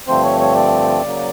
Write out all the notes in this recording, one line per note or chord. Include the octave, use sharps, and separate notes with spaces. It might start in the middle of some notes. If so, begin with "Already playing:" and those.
G2 D3 F3 A3 C4 C5
C#5
C#5
D5
C#3 F#3 A#3